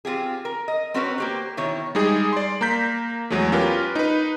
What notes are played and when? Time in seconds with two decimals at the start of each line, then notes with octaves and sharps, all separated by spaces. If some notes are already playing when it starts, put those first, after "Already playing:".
0.05 C4 F4 G4 G#4
0.45 A#4
0.68 D#5
0.94 C4 C#4 F#4 A#4 B4 C#5
1.18 A#3 G4 C5
1.57 B2 D#3 E4 C#5
1.95 G3 G#3 D#4 G#4
2.33 D5 C6
2.61 A#3 A#5 G6 B6
3.30 E2 F#3 G#3 A3
3.52 C#4 F4 G4 A#4 B4
3.95 D#4 B4